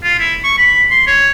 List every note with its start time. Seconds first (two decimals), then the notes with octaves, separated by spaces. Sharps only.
0.03 F4
0.19 E4
0.44 C#6
0.58 B5
0.91 C6
1.07 C#5